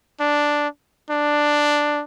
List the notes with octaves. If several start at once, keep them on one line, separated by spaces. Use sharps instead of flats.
D4
D4